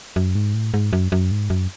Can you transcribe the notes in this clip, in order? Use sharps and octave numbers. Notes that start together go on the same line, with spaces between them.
F#2
G#2
A2
G#2
F#2
F#2
G#2
F#2